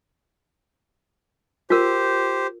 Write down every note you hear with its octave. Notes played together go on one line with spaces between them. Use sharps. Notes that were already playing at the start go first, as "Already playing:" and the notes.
F4 G4 A#4 C5